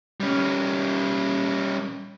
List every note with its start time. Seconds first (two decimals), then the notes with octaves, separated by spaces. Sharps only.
0.20 G3 C#4